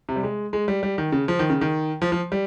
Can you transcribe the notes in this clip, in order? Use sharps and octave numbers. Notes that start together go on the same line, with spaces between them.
C3
G3
G#3
G#3
G3
G3
D#3
C#3
F3
D#3
C#3
D#3
F3
F3
G3